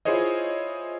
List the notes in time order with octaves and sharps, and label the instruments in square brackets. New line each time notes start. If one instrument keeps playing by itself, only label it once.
[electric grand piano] E4 F4 G#4 C5 C#5 D#5